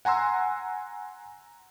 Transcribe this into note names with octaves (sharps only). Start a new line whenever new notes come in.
F#5 G#5 A#5 C6 E6